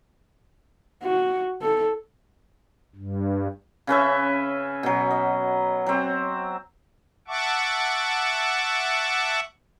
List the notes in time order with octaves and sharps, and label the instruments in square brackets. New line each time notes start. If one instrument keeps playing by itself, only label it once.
[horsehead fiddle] F#4
A4
[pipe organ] G2
[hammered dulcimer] C#3 C#4 B4 E5
B2 F#3
D#5
F#3 C4
[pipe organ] E5 F#5 A5 C#6 D6